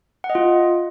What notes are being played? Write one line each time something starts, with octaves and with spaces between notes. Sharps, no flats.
F#5
D#5
F4